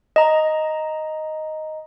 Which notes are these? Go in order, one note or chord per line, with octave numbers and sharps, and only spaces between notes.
D#5 A#5